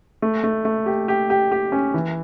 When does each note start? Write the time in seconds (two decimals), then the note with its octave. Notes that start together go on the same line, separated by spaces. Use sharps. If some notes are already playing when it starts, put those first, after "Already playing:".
0.22 A3
0.44 A3
0.65 A3
0.86 G4
1.08 G4
1.30 G4
1.52 G4
1.72 C#4
1.94 E3